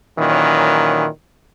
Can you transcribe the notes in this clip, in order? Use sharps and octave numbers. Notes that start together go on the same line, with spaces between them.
A#2 D#3 E3 F#3 C#4